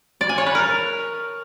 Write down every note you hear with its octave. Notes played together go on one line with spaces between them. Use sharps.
D5
G#5
C#5
B4
A#4